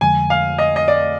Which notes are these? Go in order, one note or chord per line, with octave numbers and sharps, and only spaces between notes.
F2 D3 F3 G#3 G#5
F5
D#5
D#5
D5